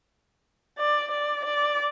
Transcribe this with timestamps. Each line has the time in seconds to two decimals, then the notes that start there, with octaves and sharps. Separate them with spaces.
0.78 D5
1.11 D5
1.45 D5